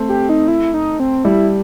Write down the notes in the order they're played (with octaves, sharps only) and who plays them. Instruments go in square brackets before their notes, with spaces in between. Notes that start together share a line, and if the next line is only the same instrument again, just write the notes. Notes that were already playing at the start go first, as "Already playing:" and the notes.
Already playing: [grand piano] A3 C4
[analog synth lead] G4
D#4
E4
D#4
C4
[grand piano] G3 [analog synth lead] E4